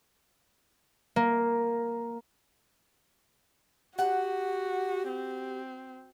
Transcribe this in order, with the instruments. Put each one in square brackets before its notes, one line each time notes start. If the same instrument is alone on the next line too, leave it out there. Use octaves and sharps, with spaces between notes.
[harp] A#3
[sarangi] F#4 [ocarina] G4 [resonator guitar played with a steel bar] F#5
[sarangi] C4